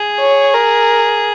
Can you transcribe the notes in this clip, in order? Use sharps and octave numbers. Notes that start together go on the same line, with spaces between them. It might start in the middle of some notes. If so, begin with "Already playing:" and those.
Already playing: G#4
C#5
A#4